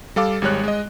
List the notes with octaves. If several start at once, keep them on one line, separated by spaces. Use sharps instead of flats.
G3 A4 F5 D6
G#1 G3 G#3 C#5 F#6
G#3 D#5